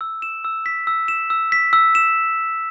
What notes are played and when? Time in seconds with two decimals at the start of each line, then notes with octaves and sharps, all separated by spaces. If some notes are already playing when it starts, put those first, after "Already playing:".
0.01 E6
0.22 E7
0.45 E6
0.66 B6
0.87 E6
1.08 E7
1.30 E6
1.52 B6
1.73 E6
1.95 E7